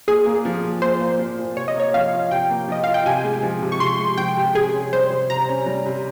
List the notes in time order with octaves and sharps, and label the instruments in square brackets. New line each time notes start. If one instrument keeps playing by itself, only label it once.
[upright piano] A#2 [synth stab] G#4
[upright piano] A#3
F3
A#2
[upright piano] A#2 [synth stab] C5
[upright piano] A#3
F3
A#2
[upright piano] C3 [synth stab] C#5
[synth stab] D#5
[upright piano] A#3 [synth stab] C#5
[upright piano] F3 [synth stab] F5
[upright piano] F4
[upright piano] C3 [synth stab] G5
[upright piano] A#3
[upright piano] F3 [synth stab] D#5
[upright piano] F4 [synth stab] F5
[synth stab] G5
[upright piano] C3 [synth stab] G#5
[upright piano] G#3
F3
C3
[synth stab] C#6
[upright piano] C3 [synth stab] C6
[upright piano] G#3
[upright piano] F3 [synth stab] G5
[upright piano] C3
[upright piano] C3 [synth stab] G#4
[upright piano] C#4
[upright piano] G3 [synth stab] C5
[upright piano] C3
[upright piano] C3 [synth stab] A#5
[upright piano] C#4
G3
C3